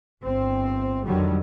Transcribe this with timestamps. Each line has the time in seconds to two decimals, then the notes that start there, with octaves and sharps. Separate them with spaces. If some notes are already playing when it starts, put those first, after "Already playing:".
0.22 G1 C4
1.05 F2 D3 D#3 F#3 G3